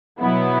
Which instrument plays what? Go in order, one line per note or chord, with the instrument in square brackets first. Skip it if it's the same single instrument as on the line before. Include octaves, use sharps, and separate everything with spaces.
[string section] B2 F#3 B3 E4